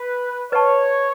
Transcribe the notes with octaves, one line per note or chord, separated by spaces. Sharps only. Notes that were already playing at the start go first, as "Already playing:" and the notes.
Already playing: B4
B4 C#5 D#5 F#5 A5 C#6